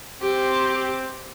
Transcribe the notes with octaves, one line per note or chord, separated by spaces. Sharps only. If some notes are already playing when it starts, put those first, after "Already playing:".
C4 G4